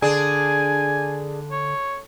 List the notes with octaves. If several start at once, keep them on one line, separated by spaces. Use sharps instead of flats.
D3 D4 G#4 G#5
C#5